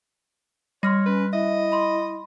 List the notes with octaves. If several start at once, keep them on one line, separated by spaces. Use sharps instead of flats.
G3 C#5 C6 F6 A#6
C#4 B4
E4 D#5 E5
B5 C6